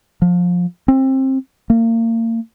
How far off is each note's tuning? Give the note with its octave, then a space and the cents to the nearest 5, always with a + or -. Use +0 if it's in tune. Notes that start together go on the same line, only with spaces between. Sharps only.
F3 +20
C4 +25
A#3 -35